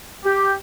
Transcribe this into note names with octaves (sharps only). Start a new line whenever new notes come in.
G4